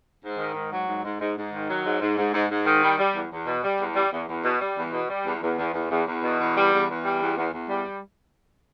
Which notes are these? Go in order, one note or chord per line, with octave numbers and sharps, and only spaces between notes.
G#2
D#3
G#2
F#3
G#2
G#2
G#2
G#2
D#3
F#3
G#2
G#2
G#2
G#2
G#2
D#3
G3
G3
E2
E2
B2
G3
E2
G3
E2
E2
B2
G3
E2
B2
G3
E2
E2
E2
E2
E2
E2
B2
E2
G3
E2
E2
G3
E2
E2
E2
G3